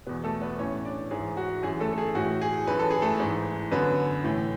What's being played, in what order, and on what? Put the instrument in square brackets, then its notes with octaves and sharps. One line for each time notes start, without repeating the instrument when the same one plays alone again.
[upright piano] E2 B2 B3 B4
A3 A4
B3 B4
A2 E3 C#4 C#5
D4 D5
G#2 E3 G#4
F#4
F#2 E3 G#4
A3 A4
A4
G#4
A2 E3 F#4
G#4
F#2 E3 B4
A4
G#4
A3 A4
G#2 E3
F#2 D3 B3 B4
A2 E3